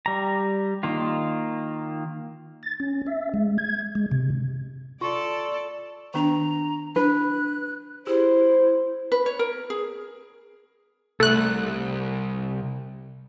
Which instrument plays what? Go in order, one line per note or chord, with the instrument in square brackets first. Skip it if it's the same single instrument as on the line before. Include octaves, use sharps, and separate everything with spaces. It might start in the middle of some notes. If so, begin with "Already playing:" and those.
[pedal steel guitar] G3 A#5
D#3 A#3 F4
[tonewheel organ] A6
C#4
E5
G#3
G#6
G#3
C3
[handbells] F4 [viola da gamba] A4 [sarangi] D5 [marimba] C#6
[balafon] D#3 B3 D4 [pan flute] A#5
[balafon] D4 [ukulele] B4 [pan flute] F#6
[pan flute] E4 [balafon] G4 G#4 [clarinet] C5
[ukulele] B4
C#5
A#4
G#4
[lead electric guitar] C2 [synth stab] A3 F#6